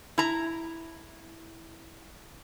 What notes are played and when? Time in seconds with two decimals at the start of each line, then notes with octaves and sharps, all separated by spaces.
0.18 E4 A#5